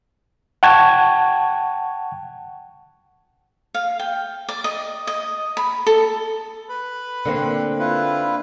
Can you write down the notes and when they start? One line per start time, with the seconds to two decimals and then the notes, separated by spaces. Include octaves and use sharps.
0.63 F#5 G5 A5 C#6 G#6
3.74 F5
3.99 G5
4.49 D5
4.64 D#5
5.07 D#5
5.57 B5
5.87 A4
6.69 B4 B5
7.25 D3 A#3 C4
7.79 E4 F4 B4